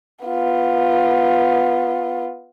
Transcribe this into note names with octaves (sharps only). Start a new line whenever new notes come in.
B3 F4